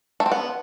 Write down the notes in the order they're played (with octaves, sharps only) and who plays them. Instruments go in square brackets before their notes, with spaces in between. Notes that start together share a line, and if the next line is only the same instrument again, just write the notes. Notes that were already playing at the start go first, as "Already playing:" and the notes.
[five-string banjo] A3
C4
B3